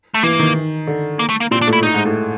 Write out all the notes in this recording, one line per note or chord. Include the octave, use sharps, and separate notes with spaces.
A3
E3 A#3
D#3
D3
A#3
A3
A#3
A#2 C4
D4
A2
E4
A2 D#4
G#2
A2